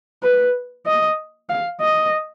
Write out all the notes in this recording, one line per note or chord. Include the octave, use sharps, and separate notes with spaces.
B4
D#5
F5
D#5